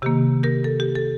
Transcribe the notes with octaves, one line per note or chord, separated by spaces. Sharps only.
C3 D#3 A#3 G4
G4 A#4
A4
G4
A4